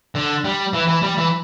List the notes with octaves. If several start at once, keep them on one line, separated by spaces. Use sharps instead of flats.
D3
G3
E3
E3
G3
E3